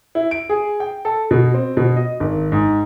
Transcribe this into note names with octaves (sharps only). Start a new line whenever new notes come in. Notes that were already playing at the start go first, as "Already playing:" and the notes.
E4
D7
G#4
G5
A4
B2
C4
B2
D#5
G#1
G#2